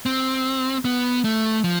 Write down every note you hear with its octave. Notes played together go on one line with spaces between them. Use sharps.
C4
B3
A3
F3